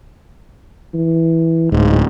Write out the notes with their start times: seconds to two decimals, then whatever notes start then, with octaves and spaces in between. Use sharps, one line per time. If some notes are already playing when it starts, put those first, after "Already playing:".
0.94 E3
1.72 D1 G#2